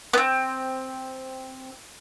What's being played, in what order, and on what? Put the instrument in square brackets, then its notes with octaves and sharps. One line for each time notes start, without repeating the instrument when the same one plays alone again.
[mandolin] B3 C4